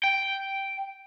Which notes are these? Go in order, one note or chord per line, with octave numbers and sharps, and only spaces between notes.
G5